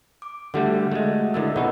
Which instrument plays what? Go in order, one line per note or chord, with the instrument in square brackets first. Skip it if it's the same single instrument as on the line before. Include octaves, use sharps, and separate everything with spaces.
[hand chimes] D6
[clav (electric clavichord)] D3 G3 A3 [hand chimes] F#4 F#5
[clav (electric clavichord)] G#3 A3
[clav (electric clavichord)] D3 G#3 A3 [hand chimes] E4 A#4 E6
[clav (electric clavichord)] B2 D#4 [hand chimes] D#5 F#5